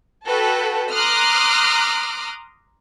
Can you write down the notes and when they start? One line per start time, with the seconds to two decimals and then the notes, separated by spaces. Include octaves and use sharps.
0.24 F#4 A4 B4 G5 A5
0.93 A#5 C6 D6 D#6 F6 F#6